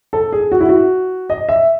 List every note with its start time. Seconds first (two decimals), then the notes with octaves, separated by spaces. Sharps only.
0.13 A4
0.32 G#4
0.52 F#4
0.61 E4
0.69 F#4
1.30 D#5
1.49 E5